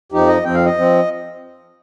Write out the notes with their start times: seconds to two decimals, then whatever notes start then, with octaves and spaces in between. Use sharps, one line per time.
0.12 F2 F3 D#4 G4
0.28 D#5
0.44 F2 F3 C4 G5
0.54 F5
0.65 D#5
0.77 F3 C4